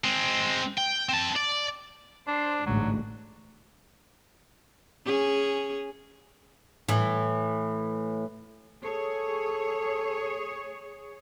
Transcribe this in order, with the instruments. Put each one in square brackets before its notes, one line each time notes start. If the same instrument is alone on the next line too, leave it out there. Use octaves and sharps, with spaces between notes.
[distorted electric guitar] G#3 C4
G5
C4 A5
D5
[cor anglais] D4 [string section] C5
[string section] A1 D2 G#2 [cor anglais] F#3
[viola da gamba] C#4 G#4
[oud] A2 E3
[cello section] G#4 C#5 [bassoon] A4